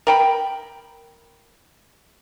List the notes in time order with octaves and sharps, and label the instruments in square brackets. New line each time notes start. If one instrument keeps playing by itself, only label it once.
[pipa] A#4 G5 B5